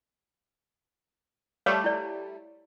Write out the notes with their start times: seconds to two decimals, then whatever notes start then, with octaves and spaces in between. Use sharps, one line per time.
1.66 G3 A3 C#5 F5
1.84 E4 D5